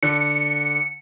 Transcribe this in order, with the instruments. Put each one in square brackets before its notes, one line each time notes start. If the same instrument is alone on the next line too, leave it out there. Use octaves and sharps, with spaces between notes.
[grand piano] D3 [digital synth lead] C#7